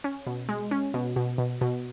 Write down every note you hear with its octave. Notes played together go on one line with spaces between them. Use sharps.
C#4
B2
G#3
C#4
B2
B2
B2
B2